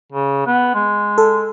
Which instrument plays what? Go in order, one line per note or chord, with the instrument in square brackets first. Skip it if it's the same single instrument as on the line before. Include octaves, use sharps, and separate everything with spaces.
[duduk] C#3
B3
G#3
[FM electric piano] A4